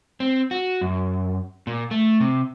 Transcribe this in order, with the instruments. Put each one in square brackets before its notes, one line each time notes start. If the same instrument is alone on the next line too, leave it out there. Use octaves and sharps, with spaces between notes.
[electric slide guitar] C4
F#4
F#2
A#2
A3
C3